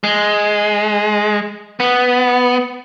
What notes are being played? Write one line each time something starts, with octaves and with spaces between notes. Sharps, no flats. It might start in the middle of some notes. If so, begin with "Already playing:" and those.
G#3
B3